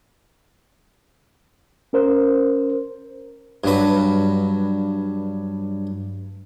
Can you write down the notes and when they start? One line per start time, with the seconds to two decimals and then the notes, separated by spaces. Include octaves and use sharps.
1.93 C#4 A#4 C5
3.64 G2 F#3 B4